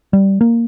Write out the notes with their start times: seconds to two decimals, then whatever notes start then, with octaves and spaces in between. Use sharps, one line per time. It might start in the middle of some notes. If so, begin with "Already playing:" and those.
0.13 G3
0.41 A#3